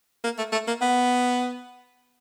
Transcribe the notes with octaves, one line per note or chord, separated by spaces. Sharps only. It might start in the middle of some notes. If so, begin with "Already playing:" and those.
A#3
A3
A3
A#3
B3